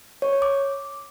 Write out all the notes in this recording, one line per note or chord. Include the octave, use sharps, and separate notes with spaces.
C#5
D6